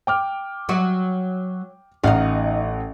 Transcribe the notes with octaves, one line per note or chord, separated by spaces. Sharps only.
G5 D6 F6
F#3 F#4
A1 D#4 F#4 F5 F#5